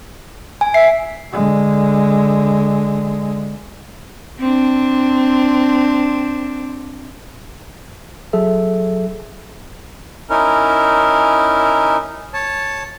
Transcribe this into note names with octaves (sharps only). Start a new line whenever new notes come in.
G#5
E5 C7
D3 G#3
C4 D4
F#3 G#4 A4 E5
C#4 D#4 E4 A#4
C#5 A5